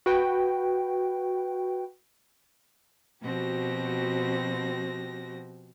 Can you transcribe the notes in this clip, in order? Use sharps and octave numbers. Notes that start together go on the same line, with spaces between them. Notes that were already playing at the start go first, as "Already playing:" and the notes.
F#4 B4 G5
B2 F3 C4 F#4 G4 A#6